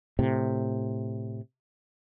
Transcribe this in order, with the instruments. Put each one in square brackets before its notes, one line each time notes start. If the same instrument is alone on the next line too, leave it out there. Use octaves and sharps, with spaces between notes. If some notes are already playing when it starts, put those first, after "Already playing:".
[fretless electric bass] A2 C3